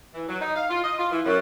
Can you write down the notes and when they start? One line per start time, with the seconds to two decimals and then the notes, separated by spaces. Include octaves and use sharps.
0.14 E3
0.28 F#3
0.41 D#4
0.55 F5
0.69 F4
0.84 D#5
0.98 F4
1.12 E3
1.25 F#2